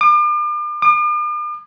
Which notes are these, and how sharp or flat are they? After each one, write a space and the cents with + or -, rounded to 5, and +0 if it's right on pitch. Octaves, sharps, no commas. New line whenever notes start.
D6 +40
D6 +45